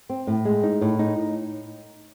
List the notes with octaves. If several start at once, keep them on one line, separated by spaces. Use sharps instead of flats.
C4
A2
G#3
D#4
A2
D#4